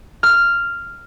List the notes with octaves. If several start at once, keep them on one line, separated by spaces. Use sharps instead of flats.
F6